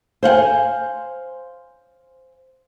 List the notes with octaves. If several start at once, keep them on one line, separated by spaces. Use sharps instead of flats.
C5 F5 F#5 G#5